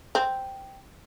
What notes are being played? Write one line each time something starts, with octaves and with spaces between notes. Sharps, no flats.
C4